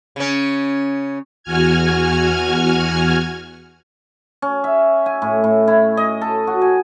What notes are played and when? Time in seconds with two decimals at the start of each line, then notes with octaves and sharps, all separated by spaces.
0.16 C#3 C#4
1.43 E2 F#4 G#5 F6 G#6
4.42 C#4
4.64 E5
5.06 G#5
5.22 A2
5.44 A2
5.68 E4
5.97 D#5
6.21 A4
6.47 F#4
6.62 G#5